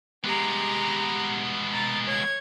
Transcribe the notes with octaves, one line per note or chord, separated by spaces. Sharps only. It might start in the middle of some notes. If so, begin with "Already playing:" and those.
G#3 B3 G4 A#5
A#5 A6
C#5 G#6